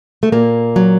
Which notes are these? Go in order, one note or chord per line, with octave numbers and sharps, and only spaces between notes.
A3
A#2 A#3
F#3